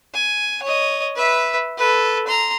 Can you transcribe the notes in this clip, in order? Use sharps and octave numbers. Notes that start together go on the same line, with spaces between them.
G#5
C#5 D#5
B4 E5
A4 B4
A#5 C6